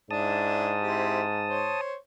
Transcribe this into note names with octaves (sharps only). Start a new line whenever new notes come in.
G#2 D4 E4 A5 D#6
C4 E4 G4
C5 C#5